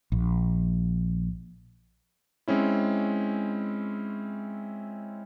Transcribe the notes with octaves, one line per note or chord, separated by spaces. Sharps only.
A#1
G#3 C4 C#4 E4